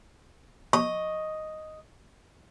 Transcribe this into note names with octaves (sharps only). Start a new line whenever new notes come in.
D#5 C#6